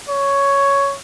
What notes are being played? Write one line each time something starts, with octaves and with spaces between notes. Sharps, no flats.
C#5